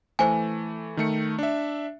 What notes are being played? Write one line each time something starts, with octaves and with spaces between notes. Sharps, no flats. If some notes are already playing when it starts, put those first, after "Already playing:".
E3 A3 C5 G#5
D#3 A3 C#7
D4 E5